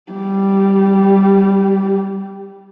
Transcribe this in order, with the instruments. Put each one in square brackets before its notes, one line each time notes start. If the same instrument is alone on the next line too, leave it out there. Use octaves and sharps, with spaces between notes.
[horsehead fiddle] G3 G4